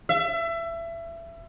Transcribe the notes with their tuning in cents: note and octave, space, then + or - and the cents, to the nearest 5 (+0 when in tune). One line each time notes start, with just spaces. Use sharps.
E5 +25